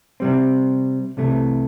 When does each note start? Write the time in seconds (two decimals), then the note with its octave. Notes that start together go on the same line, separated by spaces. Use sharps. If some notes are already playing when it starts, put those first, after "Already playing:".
0.20 C3 G3 C4
1.17 C2 C3 E3 A3